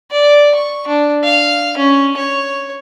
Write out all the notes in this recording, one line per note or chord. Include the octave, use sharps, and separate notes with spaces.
D5
C#6
D4
F5
C#4
C#5